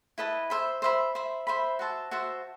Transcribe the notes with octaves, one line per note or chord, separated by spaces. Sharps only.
E4 B4 D#5 A5
C5 E5 B5
C5 E5 B5
C5 E5 B5
C5 E5 B5
F#4 C5 E5 A5
F#4 C5 E5 A5